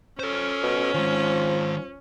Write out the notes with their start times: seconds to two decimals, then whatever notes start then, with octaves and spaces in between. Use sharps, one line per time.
0.19 C#4 A4 C5
0.63 B2
0.94 D#3 F3 G#3